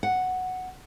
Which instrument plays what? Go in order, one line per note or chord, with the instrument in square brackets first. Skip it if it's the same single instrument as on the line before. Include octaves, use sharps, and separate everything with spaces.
[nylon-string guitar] F#5